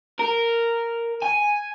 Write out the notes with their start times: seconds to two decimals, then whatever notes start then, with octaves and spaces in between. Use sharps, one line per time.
0.19 A#4
1.22 G#5